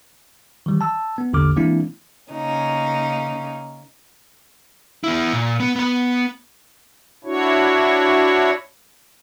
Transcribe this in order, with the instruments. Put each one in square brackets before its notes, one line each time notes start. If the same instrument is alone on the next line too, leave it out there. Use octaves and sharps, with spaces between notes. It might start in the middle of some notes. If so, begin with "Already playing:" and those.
[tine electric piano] D#3 E3 G3
A5 E6
B3
A1 E2 D3 A#3 D6 F6
E3 G#3 A#3 C4 D4 E4
[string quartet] C#3 A#3 C#4 D#4
[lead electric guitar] B3 E4
A#2
B3
B3 B5
[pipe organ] D4 E4 F#4 C#5